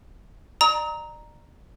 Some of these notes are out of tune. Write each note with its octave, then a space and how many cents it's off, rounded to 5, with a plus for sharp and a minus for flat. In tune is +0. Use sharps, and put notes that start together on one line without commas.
D5 +35 A#5 +0 D#6 +40